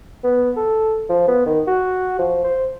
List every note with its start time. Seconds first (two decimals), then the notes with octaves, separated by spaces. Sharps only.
0.24 B3
0.57 A4
1.09 F3
1.28 B3
1.46 D#3
1.68 F#4
2.19 F3
2.44 C5